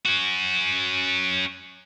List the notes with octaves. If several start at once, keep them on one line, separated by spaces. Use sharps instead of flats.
C#4 F#4